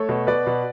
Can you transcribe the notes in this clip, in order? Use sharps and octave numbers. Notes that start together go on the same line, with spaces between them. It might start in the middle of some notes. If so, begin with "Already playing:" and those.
Already playing: A3 A4 C#5
B2
B2 B4 D5
B2